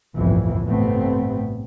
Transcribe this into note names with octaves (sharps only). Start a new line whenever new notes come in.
G1 C2 F2 A2 E3
A1 G2 C3 A3 B3 C4